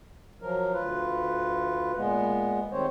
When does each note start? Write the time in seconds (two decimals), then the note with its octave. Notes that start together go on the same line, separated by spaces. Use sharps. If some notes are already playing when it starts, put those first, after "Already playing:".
0.42 F3 F#3 A#4
0.73 D2 F4 B4
1.97 A#2 G#3 B3
2.72 D#3 G3 C4 C5 C#5